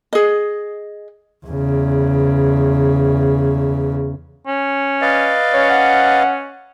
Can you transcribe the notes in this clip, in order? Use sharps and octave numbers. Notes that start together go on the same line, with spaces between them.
G#4 D#5
E2 C#3
C#4
B4 D5 D#5 F5
C#4 C#5
F#5